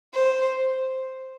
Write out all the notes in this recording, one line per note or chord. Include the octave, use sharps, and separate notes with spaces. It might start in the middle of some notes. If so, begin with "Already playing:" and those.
C5